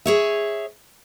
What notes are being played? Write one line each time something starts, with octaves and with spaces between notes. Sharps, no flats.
G#4 C#5 E5